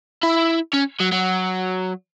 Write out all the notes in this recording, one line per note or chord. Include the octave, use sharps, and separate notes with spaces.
E4
C#4
F#3
F#3